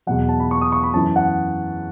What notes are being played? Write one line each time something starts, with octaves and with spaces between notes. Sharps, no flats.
E2 B2 F#3 F#5
A5
B5
C#6
D#6
C#6
B5
F#2 E3 A5
F#5